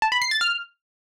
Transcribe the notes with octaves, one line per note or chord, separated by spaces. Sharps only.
A5
B5
C7
A6
F6